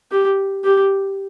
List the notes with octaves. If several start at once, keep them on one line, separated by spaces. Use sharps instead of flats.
G4
G4